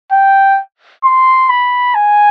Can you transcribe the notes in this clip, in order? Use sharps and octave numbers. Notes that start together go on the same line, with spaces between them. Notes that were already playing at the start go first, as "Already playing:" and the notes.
G5
C6
B5
G#5